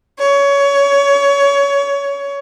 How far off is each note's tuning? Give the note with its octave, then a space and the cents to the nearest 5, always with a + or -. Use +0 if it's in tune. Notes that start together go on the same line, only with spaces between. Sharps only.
C#5 +20